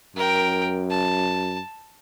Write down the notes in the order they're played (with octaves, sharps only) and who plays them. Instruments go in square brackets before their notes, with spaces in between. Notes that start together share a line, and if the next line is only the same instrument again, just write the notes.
[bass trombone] F#2 [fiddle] A#4 G5
[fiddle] A5